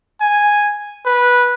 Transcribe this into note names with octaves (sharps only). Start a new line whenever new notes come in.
G#5
B4